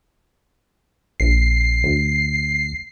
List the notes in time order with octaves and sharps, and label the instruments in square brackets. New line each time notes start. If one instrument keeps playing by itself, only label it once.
[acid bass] A#1 [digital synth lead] C7
[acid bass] D2